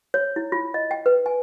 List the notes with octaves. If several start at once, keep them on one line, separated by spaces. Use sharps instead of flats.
C#5
E4
F4
D#5
G5
B4
G#5